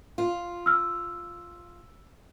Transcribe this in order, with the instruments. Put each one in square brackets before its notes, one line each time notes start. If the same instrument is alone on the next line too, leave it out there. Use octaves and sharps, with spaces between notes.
[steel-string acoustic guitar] F4
[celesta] E6 F6